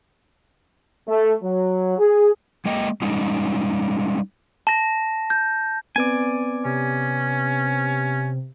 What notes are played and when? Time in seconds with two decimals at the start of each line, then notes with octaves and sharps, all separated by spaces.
1.07 A3
1.43 F#3
1.98 G#4
2.65 G#3 A#3 D#5 G5
3.02 G3 G#3 C#4 D#4
4.67 A5 A#6
5.30 G6
5.96 B3 C4 B4 D5 G#5
6.65 C3 C#4